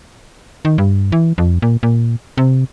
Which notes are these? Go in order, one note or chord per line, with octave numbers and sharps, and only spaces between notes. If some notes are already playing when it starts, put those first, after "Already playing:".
D#3
G2
E3
F2
A#2
A#2
C3